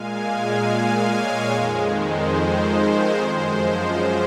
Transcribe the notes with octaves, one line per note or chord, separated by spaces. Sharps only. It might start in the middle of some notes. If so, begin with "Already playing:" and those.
Already playing: A#2 G#3 F5 G#5
F5 G#5
F5 G#5
C#5 F5
F2 D#3 G#3
C5
C5
F#2 F3 G#3 C5